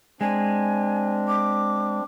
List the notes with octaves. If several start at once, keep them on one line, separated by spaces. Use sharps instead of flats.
G#3 C4 D4 G#5
D6